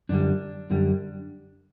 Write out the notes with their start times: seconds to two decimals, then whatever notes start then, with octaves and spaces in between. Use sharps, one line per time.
0.09 F#2 D3 G3 D4
0.70 F#2 D3 G3